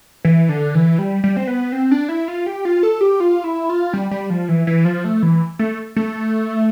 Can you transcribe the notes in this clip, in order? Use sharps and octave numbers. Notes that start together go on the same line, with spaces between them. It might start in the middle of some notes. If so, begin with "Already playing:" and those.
E3
D3
E3
G3
G3
C4
B3
C4
D4
E4
F4
G4
F4
A4
G4
F4
E4
F4
G3
G3
F3
E3
E3
F3
A3
E3
A3
A3